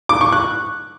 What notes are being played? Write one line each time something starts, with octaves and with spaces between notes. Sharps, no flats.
D6
C#6
F#6